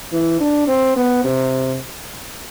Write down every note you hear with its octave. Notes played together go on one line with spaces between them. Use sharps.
E3
D4
C4
B3
C3